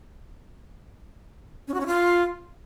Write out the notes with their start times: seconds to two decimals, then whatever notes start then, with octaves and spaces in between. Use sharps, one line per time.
1.68 C#4
1.74 F#4
1.80 C#4
1.86 F4